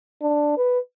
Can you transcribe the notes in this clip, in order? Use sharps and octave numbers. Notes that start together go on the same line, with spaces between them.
D4
B4